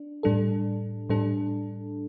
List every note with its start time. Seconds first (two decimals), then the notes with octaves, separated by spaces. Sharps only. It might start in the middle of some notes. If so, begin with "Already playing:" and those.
Already playing: D4
0.23 A2 G3 D4 A4
1.10 A2 G3 D4 A4